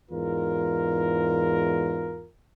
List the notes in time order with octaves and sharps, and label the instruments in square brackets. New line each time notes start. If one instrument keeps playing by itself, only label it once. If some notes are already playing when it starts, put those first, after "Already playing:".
[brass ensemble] E2 G#2 F4 A#4